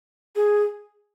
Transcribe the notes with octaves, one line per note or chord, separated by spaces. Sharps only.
G#4